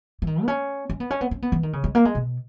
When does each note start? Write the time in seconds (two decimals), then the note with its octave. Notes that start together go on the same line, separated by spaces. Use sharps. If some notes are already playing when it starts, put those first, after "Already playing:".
0.22 E3
0.27 D#3
0.43 B3
0.48 C#4
0.90 C#4
1.00 B3
1.11 C#4
1.21 B3
1.31 C#4
1.42 B3
1.52 E3
1.63 D#3
1.73 C#3
1.84 G#3
1.95 A#3
2.05 G#3
2.15 B2